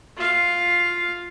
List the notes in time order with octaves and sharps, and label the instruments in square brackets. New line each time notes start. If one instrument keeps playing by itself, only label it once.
[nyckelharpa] F4 F5